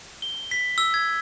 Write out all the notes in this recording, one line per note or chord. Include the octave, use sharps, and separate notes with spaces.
G7
B6
E6
G#6